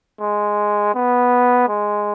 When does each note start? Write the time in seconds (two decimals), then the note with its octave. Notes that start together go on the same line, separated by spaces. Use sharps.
0.20 G#3
0.94 B3
1.68 G#3